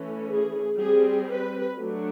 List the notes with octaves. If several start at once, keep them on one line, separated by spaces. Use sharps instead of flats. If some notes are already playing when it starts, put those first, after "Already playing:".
Already playing: E3 A3 C#4
G#4
G3 C4 G#4
B4
F#3 A3 D4